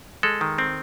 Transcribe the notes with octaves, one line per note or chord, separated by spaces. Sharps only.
G#3 A4
D#3
C4